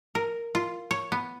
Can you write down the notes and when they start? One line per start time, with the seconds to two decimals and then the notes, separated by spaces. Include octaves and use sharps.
0.15 A#4
0.55 F4
0.91 C#5
1.12 B3